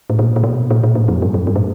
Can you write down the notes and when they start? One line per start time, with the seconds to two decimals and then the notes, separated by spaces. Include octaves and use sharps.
0.10 A2
0.19 A#2
0.36 A#2
0.44 B2
0.70 A#2
0.84 A#2
0.95 A2
1.08 F2
1.22 G2
1.34 F#2
1.47 G2
1.56 A2